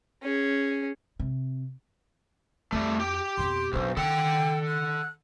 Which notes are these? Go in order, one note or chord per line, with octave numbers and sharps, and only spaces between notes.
C#4 G#4
C3
F2 G3 A3 F4
G4 G5
F2 B2 C6
B1 F2 D4 C5
D#3 A4 F#5 G5
F#6